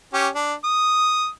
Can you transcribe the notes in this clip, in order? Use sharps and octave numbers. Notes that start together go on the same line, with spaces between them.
C#4 G4
D4
D#6